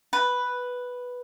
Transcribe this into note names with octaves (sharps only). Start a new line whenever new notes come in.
B4